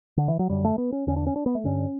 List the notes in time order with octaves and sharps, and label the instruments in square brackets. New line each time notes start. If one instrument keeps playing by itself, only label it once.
[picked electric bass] D3
E3
F#3
F#2 D3 G3
A3
B3
C#4
E2 D3 C#4
D4
C#4
D4
B3
A3
G2 D3 C#4